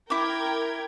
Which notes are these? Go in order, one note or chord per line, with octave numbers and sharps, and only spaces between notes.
E4 A#4 G5 D6 G#6